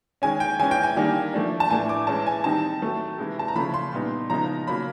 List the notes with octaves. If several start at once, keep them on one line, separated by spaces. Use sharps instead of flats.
D#3 G#3 C#4 G#5
G5
E3 G#3 C#4 G#5
G5
G#5
D#3 G3 A#3 D4
F3 A3 D4
A5
A2 E3 A3 D4 G#5
D6
E3 G#3 C#4 A5
G#5
D#3 G3 C4 D#4 A5
D#3 F#3 A3
C3 E3 G#3
A5
A#5
C#3 F3 A3 B5
C6
A#2 G3 B3 D#4
C#3 F3 G#3 B3 D#4 A#5
C#3 F#3 A#3 B5